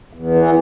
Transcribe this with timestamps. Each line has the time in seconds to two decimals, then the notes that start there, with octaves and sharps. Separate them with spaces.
0.13 E2
0.35 E3